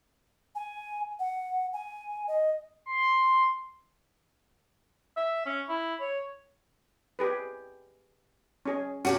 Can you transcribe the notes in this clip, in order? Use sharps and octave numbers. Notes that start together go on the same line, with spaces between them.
G#5
F#5
G#5
D#5
C6
E5
C#4
E4
C#5
G4 G#4 B4
C#4 G#4
C3 A#3 C#4 F#4 G4